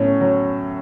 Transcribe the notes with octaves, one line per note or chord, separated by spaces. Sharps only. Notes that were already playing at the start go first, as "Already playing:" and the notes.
Already playing: A2 F#3 C#4
F#3